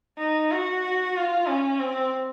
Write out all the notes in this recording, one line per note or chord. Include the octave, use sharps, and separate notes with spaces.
D#4
F#4
F4
C#4
C4